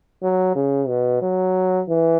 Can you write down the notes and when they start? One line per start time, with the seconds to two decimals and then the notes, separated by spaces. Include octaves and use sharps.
0.22 F#3
0.55 C#3
0.88 B2
1.22 F#3
1.89 E3